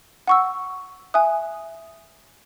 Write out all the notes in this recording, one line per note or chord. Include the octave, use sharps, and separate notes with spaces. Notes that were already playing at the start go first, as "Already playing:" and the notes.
F#5 C#6 E6
E5 G#5 D#6 F#6